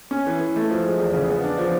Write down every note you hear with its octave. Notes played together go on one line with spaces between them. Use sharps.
C#4
E3
E3
A3
F3
G#3
E2
C#3
B3
D4
F3